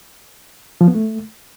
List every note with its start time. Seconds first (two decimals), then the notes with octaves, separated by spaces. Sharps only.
0.81 F3
0.88 B3
0.95 A3